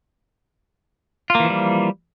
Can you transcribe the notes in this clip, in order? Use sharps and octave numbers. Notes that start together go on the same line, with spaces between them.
E3 F3 G3 A#3 F4